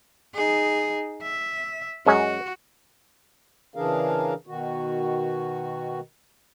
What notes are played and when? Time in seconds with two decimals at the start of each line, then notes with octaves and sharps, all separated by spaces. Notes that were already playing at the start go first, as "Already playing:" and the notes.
0.34 D#4 G#4
1.22 E5
2.06 F#2 G#3 C#4 F#4
3.76 C#3 E3 D4 G#4 A#4 F5
4.47 B2 D#3 F#4